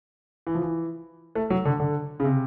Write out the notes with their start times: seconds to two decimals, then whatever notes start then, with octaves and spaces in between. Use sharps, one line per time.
0.47 E3
0.55 F3
0.62 E3
1.35 A3
1.50 F#3
1.65 D3
1.80 D3
2.20 C#3
2.24 C3